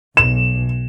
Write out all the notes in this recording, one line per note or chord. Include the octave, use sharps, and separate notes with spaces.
B1 E7